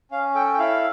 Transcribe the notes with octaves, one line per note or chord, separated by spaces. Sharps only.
C#4 F5
A4 G5
G5
E4 F5